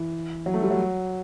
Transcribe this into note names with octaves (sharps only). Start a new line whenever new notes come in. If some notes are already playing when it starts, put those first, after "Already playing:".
Already playing: E3
F#3
A3
G3
F#3